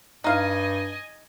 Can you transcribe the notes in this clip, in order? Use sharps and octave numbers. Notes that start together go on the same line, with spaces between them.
G2 D#4 D#5 F5 G#5